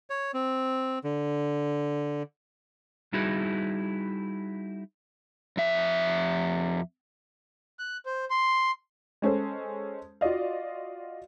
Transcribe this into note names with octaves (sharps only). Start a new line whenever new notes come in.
C#5
C4
D3
G3 D#4 E4 F#4 G#4
F2 E5
F#6
C5
C6
G#3 C#4 A4 C5
F4 F#4 D5 D#5 F5